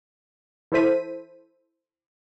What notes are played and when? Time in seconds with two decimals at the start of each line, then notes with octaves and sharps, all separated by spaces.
0.72 E3 E4 A4 C5 B6 D#7